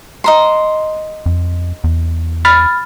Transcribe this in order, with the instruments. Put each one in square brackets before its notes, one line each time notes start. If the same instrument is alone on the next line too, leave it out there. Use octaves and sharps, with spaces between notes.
[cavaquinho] D#5 A#5 C6
[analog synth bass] F2
E2
[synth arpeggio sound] B5 F6 A6